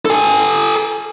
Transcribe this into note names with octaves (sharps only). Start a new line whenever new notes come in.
A4 G#5